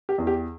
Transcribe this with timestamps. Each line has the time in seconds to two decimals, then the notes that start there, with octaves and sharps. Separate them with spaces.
0.09 G4
0.18 E2
0.27 G4